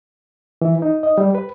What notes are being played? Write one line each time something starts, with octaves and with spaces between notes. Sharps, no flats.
E3
D#4
D#5
G3
B4